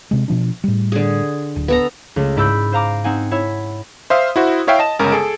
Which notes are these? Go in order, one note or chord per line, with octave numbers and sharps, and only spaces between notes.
C3 G#3
B2 F3 D4
A2 G3
D3 G#4
D1
B3 A4 A#5
C#2 A3
G#2 E4 D5 B5 E6 G6
C5 F5 A#5 D6
C4 D#4 F#5 G#5
E4 C#5 E5
C5 E5 F5 D#6
E4 F#4 C5
E4 C#5 E5 F5 G5
D#5 A5 E7
G1 C#3 G#3 A#4
G#4 A4 D7